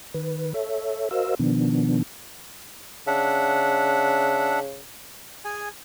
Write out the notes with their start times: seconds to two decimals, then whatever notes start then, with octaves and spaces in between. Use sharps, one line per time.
0.14 D#3 B4
0.54 A4 C#5 E5
1.11 F#4 A#4 C5 D#5 F5 E6
1.39 B2 D#3 F3 B3 D4
3.07 C#3 D4 E5 F#5
5.45 G#4 G#5